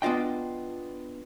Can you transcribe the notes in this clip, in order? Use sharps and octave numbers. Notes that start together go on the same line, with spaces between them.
B3 D4 F4 D#5 G5